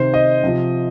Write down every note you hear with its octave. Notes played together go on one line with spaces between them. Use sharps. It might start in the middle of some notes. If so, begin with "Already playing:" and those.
Already playing: C3 D#3 C5
D#5
C3 F3